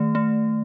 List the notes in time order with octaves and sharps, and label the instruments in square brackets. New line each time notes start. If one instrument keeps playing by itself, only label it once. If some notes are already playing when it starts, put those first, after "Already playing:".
Already playing: [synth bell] D#3 A3
A3